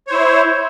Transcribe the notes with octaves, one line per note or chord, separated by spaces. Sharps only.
E4 C5 C#5